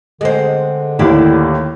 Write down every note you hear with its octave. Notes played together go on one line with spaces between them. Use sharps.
D3 G#3 C4
D#2 A2 D4 E4 G4